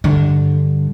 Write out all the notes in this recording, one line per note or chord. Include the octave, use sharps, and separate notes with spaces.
G2 D3